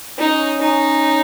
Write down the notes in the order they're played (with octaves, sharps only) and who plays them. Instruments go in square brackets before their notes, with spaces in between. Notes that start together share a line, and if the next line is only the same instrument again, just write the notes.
[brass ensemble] C#4 [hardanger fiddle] D#4
[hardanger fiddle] D#4